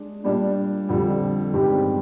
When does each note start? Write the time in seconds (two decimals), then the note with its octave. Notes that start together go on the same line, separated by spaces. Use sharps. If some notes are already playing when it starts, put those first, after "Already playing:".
Already playing: G#3 D4 G#4
0.24 A#2 G3 D4
0.89 F2 D3 G3
1.53 G2 D#3 G#3 C4 G4